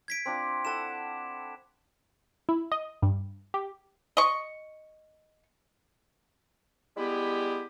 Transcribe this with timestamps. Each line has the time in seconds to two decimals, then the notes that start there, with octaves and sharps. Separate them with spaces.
0.08 G#6 B6 D7
0.25 C4 D4 F4
0.65 E4 A4 F#5 A5 E7
2.49 E4
2.72 D#5
3.02 G2
3.54 G4
4.17 D#5 C#6
6.97 G3 G#3 B3 E4 G4